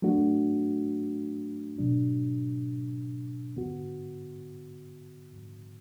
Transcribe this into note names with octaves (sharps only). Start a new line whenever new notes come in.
F#3 A3 D4 F#4
B2 F#3 D4
D3 B3 F#4